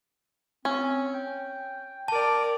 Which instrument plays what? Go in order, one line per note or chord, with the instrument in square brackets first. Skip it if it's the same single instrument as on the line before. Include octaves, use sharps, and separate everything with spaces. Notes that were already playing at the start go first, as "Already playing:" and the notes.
[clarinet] C4 [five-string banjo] C#4
[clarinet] G5
[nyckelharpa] A#4 D5 [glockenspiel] A5